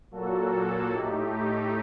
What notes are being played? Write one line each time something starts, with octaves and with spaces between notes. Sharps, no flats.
A#2 F#3 A#3 F#4 A4
A2 A3 D#4 G4